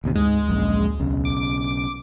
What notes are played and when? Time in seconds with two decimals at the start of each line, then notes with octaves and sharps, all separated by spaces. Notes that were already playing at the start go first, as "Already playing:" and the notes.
0.04 A1 D#2 C3
0.15 D2 G#2 G#3
0.48 A#1 F#2
0.99 B1 C#3
1.25 D6